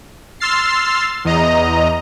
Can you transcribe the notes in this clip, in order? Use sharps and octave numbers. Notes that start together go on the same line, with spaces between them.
C6 E6 F6 A6 C7
E2 D#5 A#5